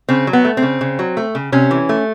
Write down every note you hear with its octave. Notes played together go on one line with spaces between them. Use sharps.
C#3 C4
F#3
B3
A3
C4
C#3
C#3
F#3
A3
C#3
C3 C#4
E3
A3